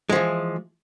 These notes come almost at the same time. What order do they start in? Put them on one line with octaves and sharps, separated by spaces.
G#3 F3 E3